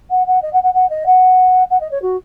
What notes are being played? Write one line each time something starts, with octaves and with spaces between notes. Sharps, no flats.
F#5
F#5
D#5
F#5
F#5
F#5
D#5
F#5
F#5
D#5
C#5
F#4